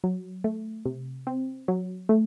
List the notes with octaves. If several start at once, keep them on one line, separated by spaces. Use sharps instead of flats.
F#3
A3
C3
C4
F#3
A3